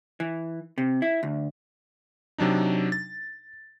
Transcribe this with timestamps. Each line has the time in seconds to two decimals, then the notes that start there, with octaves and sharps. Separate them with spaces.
0.20 E3
0.78 C3
1.02 E4
1.23 D2
2.38 C3 F#3 D4 D#4
2.92 A6